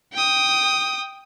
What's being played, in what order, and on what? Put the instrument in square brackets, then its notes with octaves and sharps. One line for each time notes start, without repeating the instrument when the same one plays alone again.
[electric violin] G5 D#6